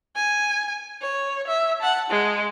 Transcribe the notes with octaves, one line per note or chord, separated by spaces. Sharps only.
G#5
C#5
E5
F#5 A5
G#3